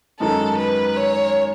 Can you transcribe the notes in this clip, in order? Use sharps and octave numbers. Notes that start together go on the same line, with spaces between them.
F#2 D#3 G#3 A4
B4
C#5